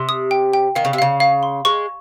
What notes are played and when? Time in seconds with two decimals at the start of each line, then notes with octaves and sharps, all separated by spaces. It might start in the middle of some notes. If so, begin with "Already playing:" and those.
Already playing: C3 C6
0.09 D#6
0.31 G5
0.53 G5
0.75 D#3 F5
0.85 C#3
0.93 C3
0.99 C#3 F5
1.20 F5
1.43 C6
1.65 G#3 C#6